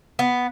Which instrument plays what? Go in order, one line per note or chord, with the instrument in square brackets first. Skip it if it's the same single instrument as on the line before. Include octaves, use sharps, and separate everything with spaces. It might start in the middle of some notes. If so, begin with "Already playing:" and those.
[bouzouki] B3